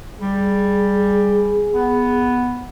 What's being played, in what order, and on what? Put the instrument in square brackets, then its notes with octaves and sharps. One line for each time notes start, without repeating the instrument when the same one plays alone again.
[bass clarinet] G3 [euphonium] G#4
[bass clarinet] B3